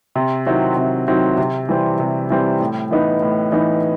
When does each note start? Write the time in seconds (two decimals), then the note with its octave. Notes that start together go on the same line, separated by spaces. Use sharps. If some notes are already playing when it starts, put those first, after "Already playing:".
0.15 C3
0.46 D#3 F#3 C4 E4
0.77 C3
1.08 D#3 F#3 C4 E4
1.37 C3
1.69 E3 G3 C4
2.00 C3
2.30 E3 G3 C4
2.60 A2
2.91 E3 B3 D#4
3.22 A2
3.52 E3 B3 D#4